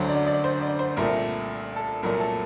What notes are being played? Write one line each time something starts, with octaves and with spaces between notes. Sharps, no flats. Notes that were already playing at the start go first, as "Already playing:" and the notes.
Already playing: D2 D3 F#3 C5
D5
D5
C5
D5
C5
C2 A#2 A3 A#4
A4
C2 A#2 F#3 A3 A#4
A4